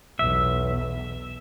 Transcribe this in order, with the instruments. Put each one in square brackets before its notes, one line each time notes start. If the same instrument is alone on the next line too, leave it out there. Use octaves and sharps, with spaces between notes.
[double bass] B1 E2 [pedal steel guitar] E5